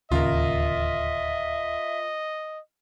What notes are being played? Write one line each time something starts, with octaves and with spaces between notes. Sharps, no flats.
D1 D#2 C#3 F4 A#4 D#5 E5